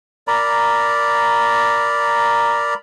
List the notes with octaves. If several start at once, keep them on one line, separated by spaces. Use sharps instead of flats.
A#4 D5 A#5 B5